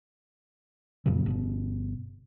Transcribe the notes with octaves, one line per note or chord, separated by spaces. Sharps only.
F2 A#2 C#3 F#3
G1 B2 B3